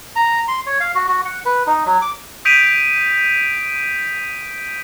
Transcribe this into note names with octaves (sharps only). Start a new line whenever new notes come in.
A#5
C6
C#5
F5
F#4
F#4
F#5
B4
D#4
F#3
D6
D#6 G6 B6 D7 D#7 F7